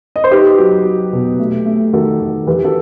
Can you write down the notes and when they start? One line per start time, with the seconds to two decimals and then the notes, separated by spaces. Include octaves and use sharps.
0.16 D#5
0.24 C5
0.31 D#4 G4 B4
0.58 F#3
0.85 F#3
1.13 B2
1.39 A3
1.66 A3
1.93 D#3 F#4 A4
2.20 D#3
2.47 E3 G4 B4
2.65 F#4 A4